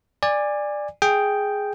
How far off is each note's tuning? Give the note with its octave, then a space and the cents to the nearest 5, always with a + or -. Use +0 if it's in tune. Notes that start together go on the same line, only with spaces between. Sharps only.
D5 +10 G#5 -25
G#4 +0 G5 +0